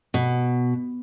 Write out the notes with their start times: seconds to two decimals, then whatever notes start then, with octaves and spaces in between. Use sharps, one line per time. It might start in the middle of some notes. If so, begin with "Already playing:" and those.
0.14 B2